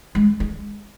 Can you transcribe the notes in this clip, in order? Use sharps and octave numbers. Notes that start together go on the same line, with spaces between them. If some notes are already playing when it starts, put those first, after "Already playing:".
G#3
G#3